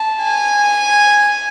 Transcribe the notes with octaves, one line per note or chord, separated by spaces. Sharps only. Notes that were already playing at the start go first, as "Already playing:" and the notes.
Already playing: A5
G#5